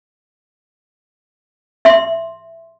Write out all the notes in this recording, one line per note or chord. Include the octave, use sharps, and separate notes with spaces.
E5 C6